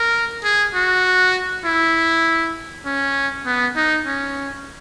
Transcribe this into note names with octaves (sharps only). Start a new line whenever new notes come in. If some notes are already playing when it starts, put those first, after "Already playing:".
Already playing: A#4
G#4
F#4
E4
C#4
B3
D#4
C#4